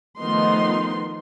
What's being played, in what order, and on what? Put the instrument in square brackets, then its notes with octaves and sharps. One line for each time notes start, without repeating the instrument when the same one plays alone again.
[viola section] D#3 F3 A3 B3 D#4 C6